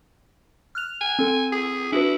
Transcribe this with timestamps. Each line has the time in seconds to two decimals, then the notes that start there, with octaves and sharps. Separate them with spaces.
0.75 F6 F#6 F7
1.01 G#5
1.19 C4 A4
1.53 G#4
1.92 D4 E4 F#4 B4